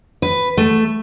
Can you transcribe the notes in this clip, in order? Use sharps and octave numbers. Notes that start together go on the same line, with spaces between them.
B4
A3